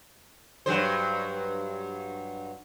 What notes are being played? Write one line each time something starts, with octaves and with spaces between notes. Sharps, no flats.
G2 F#3 C5